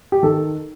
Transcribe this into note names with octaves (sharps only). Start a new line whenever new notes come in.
G4
D#3 A4